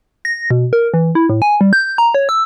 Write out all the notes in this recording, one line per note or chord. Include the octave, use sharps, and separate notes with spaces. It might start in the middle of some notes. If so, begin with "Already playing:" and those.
A#6
B2
A#4
E3
E4
A2
G#5
G3
G6
A#5
C#5
E6